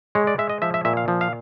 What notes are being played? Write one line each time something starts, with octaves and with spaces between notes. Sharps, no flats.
G#3 C#5
D5
G#3 E5
D#5
F3 E5
E5
A#2 E5
F5
F3
F5